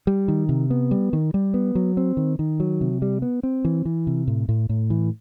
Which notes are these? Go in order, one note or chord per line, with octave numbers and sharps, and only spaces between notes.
G3
D#3
C3
B3
G3
D#3
G3
B3
F#3
C4
D#3
D#3
F#3
C3
G3
B3
C4
E3
E3
C3
A2
A2
A2
E3